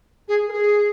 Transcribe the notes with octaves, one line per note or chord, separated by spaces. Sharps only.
G#4
A#4
G#4